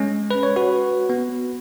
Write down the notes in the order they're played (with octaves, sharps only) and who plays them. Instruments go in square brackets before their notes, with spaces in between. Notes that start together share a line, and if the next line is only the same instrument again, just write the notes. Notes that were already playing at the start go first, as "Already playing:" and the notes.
Already playing: [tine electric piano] G#3 C#4
B4
C#5
F#4 B4
B3